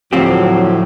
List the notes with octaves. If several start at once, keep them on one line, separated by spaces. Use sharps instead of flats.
D2 A2 F3 F#3 C4 G4